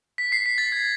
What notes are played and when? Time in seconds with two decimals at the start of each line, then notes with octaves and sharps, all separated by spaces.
0.18 B6
0.32 C7
0.46 B6
0.58 A6
0.72 G#6